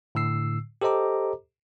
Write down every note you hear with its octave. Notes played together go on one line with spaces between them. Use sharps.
A2 D3 E6 C7
G4 A4 C5 D#5 A#5 D6